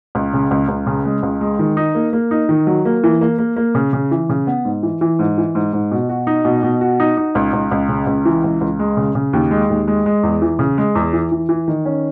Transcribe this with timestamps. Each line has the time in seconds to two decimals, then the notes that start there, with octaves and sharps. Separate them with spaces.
0.15 C#2
0.33 C#3
0.51 C#2
0.68 C#2
0.87 C#3
1.05 G#3
1.23 C#2
1.41 G#3
1.59 D#3
1.77 D#4
1.95 A#3
2.13 A#3
2.31 D#4
2.49 D#3
2.67 F#3
2.85 A#3
3.04 E3
3.21 A#3
3.39 A#3
3.56 A#3
3.75 C#3
3.93 C#3
4.11 E3
4.29 C#3
4.47 B3
4.65 G#2
4.83 E3
5.01 E3
5.19 G#2
5.38 E3
5.55 G#2
5.73 G#2
5.92 B2
6.09 F#4
6.27 D#4
6.45 B2
6.63 B2
6.81 F#4
7.00 D#4
7.17 D#4
7.35 C#2
7.53 C#2
7.71 C#2
7.89 C#3
8.07 C#2
8.25 E3
8.44 C#2
8.61 C#2
8.79 G#3
8.97 C#3
9.15 C#3
9.33 D#2
9.51 G#3
9.70 D#2
9.88 G#3
10.06 G#3
10.23 E2
10.42 E3
10.59 C#3
10.78 G#3
10.95 E2
11.13 E3
11.32 E3
11.49 E3
11.68 D#3
11.86 C#4